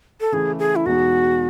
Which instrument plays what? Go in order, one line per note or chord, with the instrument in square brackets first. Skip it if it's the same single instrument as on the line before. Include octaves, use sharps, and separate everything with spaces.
[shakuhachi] A4
[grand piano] C#3 E3 A3 [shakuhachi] G#4
[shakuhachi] G#4
E4
[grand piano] E2 B2 G#3 D#4 [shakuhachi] F#4